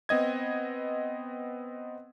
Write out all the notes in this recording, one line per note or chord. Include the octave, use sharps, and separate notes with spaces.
B3 C4 D#5 G#6